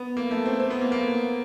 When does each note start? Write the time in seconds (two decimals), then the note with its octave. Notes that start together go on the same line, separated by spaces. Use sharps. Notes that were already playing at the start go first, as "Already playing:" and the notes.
Already playing: B3
0.17 A#3
0.31 A3
0.46 C4
0.60 C4
0.70 B3
0.81 A#3
0.92 A#3